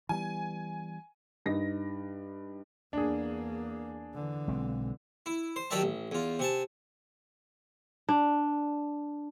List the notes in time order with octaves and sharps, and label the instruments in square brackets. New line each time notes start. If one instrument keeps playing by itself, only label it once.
[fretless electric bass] E3 G3 B3 [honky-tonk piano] G#5
[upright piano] G2 D#4 A#6
[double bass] E2 A#3 [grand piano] D4 G#4
[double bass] D3 E3
[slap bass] B1 G#3 C4
[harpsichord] E4
C5
D#3 F#3 G4 D5 E5 A5
A1
E2 F4
C3 G#5 A5
[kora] D4